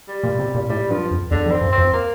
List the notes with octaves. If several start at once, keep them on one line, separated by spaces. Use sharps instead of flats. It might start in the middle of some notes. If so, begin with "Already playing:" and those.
G3
A#2
C3
A#2
A2 G3
G2 F3
F2
E2 D3
F2
C4
G2
C4
F2
A#3